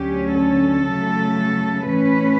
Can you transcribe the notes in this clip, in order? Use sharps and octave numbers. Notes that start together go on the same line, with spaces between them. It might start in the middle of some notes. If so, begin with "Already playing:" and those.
Already playing: D2 D3 F#3 C#4 G4
A4
C#3 F#3 A3 C#4
A2 E3 A3 C#4 B4